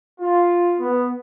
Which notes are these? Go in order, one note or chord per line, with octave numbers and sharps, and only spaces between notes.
F4
B3